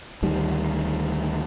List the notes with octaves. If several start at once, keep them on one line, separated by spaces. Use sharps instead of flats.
D2 D#3 G3